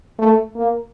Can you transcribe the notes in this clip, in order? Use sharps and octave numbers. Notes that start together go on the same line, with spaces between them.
A3
A#3